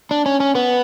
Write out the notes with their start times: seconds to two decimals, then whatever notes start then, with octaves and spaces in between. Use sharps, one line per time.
0.11 D4
0.26 C#4
0.40 C#4
0.55 B3